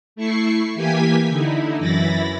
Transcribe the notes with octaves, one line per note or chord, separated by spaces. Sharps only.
A3 E4 C#6 C7
E3 A#3 G4 G#5 G#6 B6
D3 D#4 E4
F#2 E3 E4 B5 A6 A#6